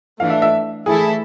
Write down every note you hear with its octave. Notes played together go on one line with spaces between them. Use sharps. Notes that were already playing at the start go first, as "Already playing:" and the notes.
E3 A3 D4 F5
E5
E5
E3 A3 E4 G#4 A4